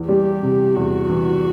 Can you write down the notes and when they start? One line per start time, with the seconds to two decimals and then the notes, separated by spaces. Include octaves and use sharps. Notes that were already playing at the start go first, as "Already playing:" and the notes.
Already playing: E2 E3
0.08 G3 G4
0.42 C3
0.75 E2 F#4
1.10 E3